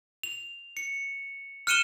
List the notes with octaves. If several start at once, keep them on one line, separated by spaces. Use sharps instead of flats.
F7
C#7
F6 F#6 C#7 D#7 E7 G7